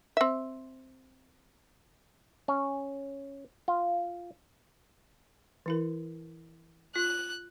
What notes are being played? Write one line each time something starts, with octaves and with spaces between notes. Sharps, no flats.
C4 E5
C#4
F4
E3 E4 A#4
F4 F#6